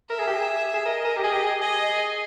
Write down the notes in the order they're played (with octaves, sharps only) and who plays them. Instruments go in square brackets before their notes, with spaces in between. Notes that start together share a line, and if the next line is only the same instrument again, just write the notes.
[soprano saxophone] A#4 [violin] E5
[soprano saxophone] G#4
G4
G#4
G#4
[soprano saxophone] A#4 [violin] D#5
[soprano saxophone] A#4
G4
[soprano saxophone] G#4 [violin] D#5
[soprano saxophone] G4
G#4
[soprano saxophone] G#4 [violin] D#5